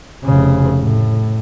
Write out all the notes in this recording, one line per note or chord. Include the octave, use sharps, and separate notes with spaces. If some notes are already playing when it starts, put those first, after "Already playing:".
F1 C#3
A2